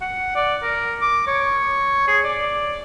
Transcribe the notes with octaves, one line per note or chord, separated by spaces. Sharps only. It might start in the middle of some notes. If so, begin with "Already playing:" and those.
F#5
D5
A#4
D6
C#5
G#4
D5